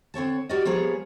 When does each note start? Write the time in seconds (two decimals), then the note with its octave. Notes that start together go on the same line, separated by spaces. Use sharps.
0.14 D3 C4 C#5 A5
0.49 F#4 G4 A#4 D5 D#5
0.65 F3 G3 A#3 B3 G#4 C#5